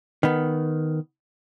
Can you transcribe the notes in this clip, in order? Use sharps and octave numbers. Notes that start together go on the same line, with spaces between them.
D#3 B3